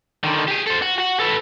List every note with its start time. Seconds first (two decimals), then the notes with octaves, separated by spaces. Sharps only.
0.24 D3 D#3
0.48 G4 G#4
0.67 A4 C5
0.82 F#4
0.98 F#4 F#5
1.20 A4 B4